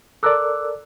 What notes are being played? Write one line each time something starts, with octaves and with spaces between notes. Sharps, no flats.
A4 A#4 D5 D6 E6 F#6